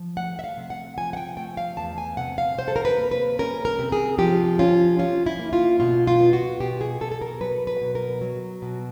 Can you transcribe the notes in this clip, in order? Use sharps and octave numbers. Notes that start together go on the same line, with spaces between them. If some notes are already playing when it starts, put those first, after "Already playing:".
Already playing: F3
A3 F#5
E5
F5
C3
F#5
F3 G#5
F#5
G5
A3 G5
F5
E2 A5
G#5
C3 F#5
F5
C3 C5
A4
A#4
B4
A#3
B4
C#4 A#4
A#4
C3
G#4
F3 G4
C#4 F4
C#4 F4
E4
A#3
F4
B2 F4
F4
B3
F#4
B2 G4
G#4
B2 A4
A4
A#4
F#3 B4
B4
B2
A#4
F#3
B2